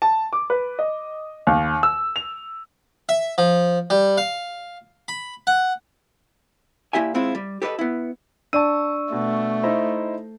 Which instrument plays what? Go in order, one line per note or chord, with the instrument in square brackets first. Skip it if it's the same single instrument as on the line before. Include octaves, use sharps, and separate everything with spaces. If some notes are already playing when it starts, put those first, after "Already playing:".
[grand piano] A5
D6
B4
D#5
D#2
E6
F7
[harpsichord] E5
F3
G3
F5
B5
F#5
[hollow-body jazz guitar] A#2 A#3 E4 G4 E5 G#5
G#3 C4 E4 F4
G3
G4 A4 B4 D5 D#5
B3 E4
[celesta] D4 D5 [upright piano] A5 D#7 [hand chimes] C#6 E6
[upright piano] B2 [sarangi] A3
[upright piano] D#4 E4 C5